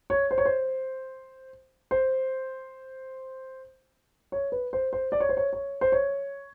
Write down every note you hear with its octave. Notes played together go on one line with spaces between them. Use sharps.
C#5
C5
C#5
C5
C5
C#5
B4
C5
C5
D5
C#5
C5
C#5
C#5
C5
C#5